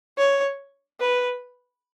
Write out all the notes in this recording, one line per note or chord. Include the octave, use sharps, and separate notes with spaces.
C#5
B4